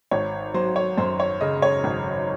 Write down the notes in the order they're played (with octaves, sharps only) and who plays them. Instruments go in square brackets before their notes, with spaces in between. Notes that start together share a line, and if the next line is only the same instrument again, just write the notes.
[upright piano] G#1 C#5
F#3 C5
C#5
F#2 C5
C#5
C#3 D#5
C#5
G#1